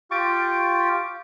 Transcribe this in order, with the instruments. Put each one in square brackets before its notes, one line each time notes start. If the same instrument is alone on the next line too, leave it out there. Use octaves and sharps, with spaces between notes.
[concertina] F4 G4 [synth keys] C#6 A6 D7